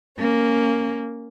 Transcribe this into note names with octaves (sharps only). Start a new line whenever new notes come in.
A#3 C#4